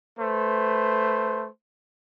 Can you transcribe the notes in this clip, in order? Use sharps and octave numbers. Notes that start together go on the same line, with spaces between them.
A3 B4 C5